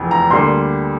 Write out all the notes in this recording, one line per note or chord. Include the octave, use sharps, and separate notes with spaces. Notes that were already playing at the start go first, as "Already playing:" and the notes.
Already playing: F1 E2 E3
A#5
D2 D3 G3 A#3 C6